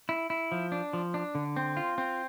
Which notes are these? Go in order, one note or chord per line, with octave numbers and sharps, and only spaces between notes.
E4
E4
F3
D4
F3
D4
D3
C4
F4
C4